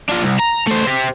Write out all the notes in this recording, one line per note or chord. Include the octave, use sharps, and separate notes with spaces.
D4 F4
C2
A#5
A3 C5
C4 G4